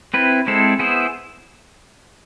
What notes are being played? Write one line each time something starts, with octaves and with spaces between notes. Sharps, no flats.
C4 E4 B4
G#3 C4 E4 A4 C5
B3 E4 G#4 C5